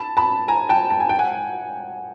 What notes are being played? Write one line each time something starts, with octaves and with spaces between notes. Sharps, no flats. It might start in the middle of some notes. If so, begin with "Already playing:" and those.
Already playing: A5 B5
A5 B5
G#5 A#5
G5 A5
A5
G#5
G5
F#5 G#5